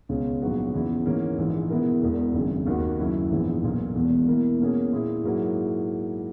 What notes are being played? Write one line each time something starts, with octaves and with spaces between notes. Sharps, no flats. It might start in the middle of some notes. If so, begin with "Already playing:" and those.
C#2 B2 G#3 C#4
A#1 G#2 F#3 B3 F#4
E2 C#3 E3 B3
G#2 E3 A#3 C#4
A#1 G#2 E3
B2 G#3 B3 E4 A#4
E1 E2 B2
G#1 F#2 C#3
D#2 D#3 A#3 D#4 F#4
F#2 C#3 F#3 C#4 E4
A#1 G#2 E3 G#3 B3
B1 A#2 A#3
E1 E2 B2
B2 A#3 E4 A#4
B2 A#3 C#4 G#4
A#2 A#3 E4 G#4
G#2 F#3 A#3 E4 G#4